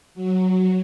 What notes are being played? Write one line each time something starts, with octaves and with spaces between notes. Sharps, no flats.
F#3